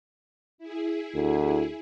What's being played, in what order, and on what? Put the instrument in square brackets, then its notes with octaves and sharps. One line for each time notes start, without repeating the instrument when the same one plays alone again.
[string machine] E4 G#4
[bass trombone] D2